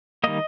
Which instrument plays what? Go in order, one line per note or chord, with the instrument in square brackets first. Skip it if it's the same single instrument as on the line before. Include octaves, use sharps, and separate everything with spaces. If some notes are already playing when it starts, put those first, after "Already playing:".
[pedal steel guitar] D#3 G3 A#3 D#5